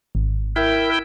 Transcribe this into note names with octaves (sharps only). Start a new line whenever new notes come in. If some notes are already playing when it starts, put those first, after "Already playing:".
G#1
E4 A#4 E5 G5